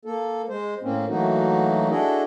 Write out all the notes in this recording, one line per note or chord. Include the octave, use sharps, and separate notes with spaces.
A#3 A4
G#3 C5
A2 A#3 C4 C#4
E3 F#3 A3 A#3 D#4 F#4
D4 E4 F#4 G#4 A4 D#5